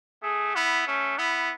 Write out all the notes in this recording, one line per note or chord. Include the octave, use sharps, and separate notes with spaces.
A3 G#4
B3 E4
A3 C#4
B3 E4